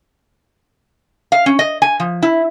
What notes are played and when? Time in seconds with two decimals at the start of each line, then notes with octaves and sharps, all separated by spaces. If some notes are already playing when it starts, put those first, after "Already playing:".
1.32 F5
1.46 C#4
1.59 D#5
1.82 G#5
2.00 F3
2.23 E4